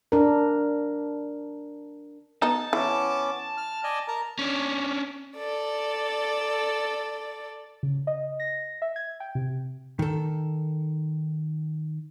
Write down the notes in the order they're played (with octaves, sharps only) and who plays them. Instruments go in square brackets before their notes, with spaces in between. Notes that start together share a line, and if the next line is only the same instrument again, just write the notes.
[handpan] D4 A#4
[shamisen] B3 D#4 [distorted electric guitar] A5
[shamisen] E3 [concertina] B3 C#4 D6
[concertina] F6
D5 D#5 G#5
A#4 A5 A#5
[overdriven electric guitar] C#4 D4
[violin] A4 D5
[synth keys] C#3
D#5
A#6
E5
G#6
G5
C3
[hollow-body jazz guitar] D#3 A4